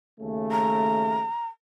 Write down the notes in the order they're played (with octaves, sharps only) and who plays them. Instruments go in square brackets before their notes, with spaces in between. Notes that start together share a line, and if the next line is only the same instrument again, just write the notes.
[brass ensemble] D#2 C#3 A3
[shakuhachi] A#5